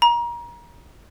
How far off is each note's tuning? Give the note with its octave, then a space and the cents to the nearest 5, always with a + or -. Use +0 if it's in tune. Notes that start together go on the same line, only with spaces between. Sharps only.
A#5 +30